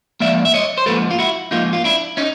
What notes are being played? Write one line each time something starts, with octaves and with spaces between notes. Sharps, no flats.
G#2 F3 A#3 D5 E5
E5
C#5 D#5
C5
G#2 F3 A#3 A4 B4
F4
E4 F#4
G#2 F3 A#3 D#4 F4
F4
D4 E4
C#4 D#4